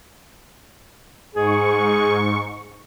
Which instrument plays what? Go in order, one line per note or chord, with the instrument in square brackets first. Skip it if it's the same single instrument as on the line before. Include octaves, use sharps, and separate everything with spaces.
[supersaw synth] G#2 C#6 [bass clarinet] G#4